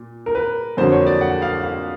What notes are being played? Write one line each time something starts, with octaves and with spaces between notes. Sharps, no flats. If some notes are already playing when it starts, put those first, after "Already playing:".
Already playing: A#2
A#4
B4
F2 D3 F#3 A#3 C5
C#5
D5
F#5
F5
F5